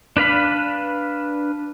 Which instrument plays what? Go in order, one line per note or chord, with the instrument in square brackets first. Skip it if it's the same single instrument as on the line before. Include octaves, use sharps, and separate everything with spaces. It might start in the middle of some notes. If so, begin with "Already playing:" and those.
[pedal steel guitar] D4 B4 F5 B5